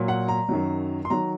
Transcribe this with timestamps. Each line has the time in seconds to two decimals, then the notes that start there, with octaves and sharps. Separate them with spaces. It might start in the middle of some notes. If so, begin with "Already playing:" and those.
Already playing: A#2 F#3
0.08 F#5
0.28 A#5
0.49 F#2 D#3 F#3
1.05 C6
1.10 D#3 F#3 A#5